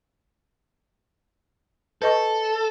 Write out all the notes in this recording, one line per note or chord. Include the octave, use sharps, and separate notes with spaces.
A4 B4 D#5 C#6